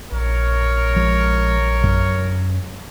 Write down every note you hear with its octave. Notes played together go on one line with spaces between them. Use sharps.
A#1 A#4 C#5
F3 G#3
F#2